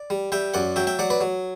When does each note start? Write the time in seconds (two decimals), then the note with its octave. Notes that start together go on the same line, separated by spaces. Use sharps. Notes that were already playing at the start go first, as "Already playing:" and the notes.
Already playing: D5
0.10 G3
0.32 G3 E5 G5
0.54 F#2 D5 F#5
0.76 F#3 E5 G5
0.87 E5 G5
0.99 F#3 D5 F#5
1.10 B4 D5
1.21 F#3